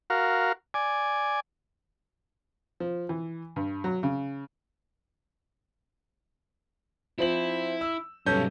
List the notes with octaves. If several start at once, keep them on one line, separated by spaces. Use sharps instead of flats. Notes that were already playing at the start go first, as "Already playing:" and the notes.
F#4 A#4 F5
D5 G#5
F3
E3
G2
F#3
C#3
F3 C4 E4 F#7
E6
B1 G2 C#4 A4 G6